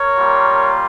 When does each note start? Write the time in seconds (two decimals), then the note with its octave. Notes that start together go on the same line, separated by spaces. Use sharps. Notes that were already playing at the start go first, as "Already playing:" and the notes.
Already playing: A#4 C#5
0.16 G3 A#3 F4